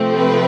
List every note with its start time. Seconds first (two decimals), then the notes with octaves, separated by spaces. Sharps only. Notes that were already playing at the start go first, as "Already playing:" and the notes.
Already playing: C3 F3 A3 C4
0.17 B4